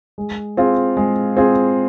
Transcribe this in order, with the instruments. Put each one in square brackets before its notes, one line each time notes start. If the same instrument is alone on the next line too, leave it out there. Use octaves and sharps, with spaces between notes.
[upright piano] G#3
C4 F4 G#4
G#3
C4 F4 G#4